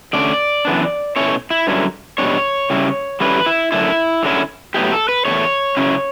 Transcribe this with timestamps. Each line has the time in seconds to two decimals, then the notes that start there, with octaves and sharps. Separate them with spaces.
0.13 D3 A3 C#4 D5
0.65 F#2 E3 B3 D4
1.16 B2 A3 C#4 E4 C#5
1.51 E4
1.67 G2 D3 F#3 C#4 E4
2.18 B2 G3 D4 C#5
2.70 C#3 G3 C#4 E4
3.20 D3 G3 C#4 E4 B4
3.46 E4
3.72 F#2 D3 A3 E4
4.23 D3 F#3 C#4 E4
4.74 A2 F#3 B3 E4 G4
4.92 A4
5.09 B4
5.25 E2 B2 A3 C#5
5.77 C#3 F#3 C#4 E4